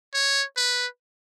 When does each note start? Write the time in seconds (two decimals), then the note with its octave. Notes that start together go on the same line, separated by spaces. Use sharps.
0.14 C#5
0.57 B4